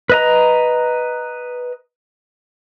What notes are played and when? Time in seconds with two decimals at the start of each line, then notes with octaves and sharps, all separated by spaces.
0.10 B4 D#5 A#5